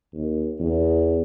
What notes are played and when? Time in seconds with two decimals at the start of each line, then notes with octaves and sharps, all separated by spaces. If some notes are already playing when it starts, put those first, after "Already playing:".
0.14 D#2
0.60 E2